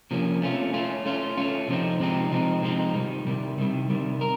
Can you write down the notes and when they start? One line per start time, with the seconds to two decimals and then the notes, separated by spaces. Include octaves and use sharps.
0.11 C3 F3 A#3 C#4
0.42 A3 C#4 F4
0.73 A3 C#4 F4
1.06 A3 C#4 F4
1.37 A3 C#4 F4
1.68 C3 F3 G#3 C4 D#4
2.00 C3 F3 G#3 C4 D#4
2.32 C3 F3 G#3 C4 D#4
2.63 C3 F3 G#3 C4 D#4
2.94 C3 D#3 G3
3.27 C3 D#3 G3
3.58 C3 D#3 G3
3.90 C3 D#3 G3
4.21 A#4